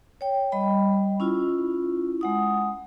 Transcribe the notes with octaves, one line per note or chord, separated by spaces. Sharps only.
C#5 G5
G3 D#5 G5 B5
C#4 E4 F4
G#3 F#5 D#6